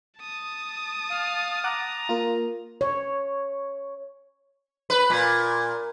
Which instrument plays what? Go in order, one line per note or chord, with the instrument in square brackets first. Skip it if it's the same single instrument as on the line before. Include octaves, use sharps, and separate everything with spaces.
[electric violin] A5 D#6
[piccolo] F5 [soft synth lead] A6
[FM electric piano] F#5 D6 F#6 [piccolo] A#5
[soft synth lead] A#3 [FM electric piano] F4 A#4
[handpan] C#5
[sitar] B4
A#2